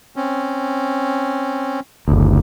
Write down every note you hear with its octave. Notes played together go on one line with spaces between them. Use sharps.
C4 C#4
F#1 D2